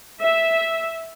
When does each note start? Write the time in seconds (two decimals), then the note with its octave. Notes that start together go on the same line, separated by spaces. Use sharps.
0.21 E5